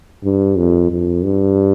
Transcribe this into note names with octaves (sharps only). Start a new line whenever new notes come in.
G2
F2
F2
G2